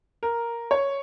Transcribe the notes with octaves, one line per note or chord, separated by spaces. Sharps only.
A#4
C#5